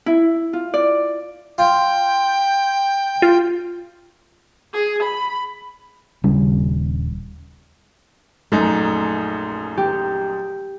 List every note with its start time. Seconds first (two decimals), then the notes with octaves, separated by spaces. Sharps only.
0.06 E4
0.53 F4
0.74 D5
1.58 F4 G5
3.22 F4
4.73 G#4
5.03 B5
6.24 D#1 C#3 G3 C#4
8.52 A#1 F#2 A3 D#4
9.77 G4